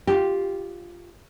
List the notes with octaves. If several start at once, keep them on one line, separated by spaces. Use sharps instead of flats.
F4 G4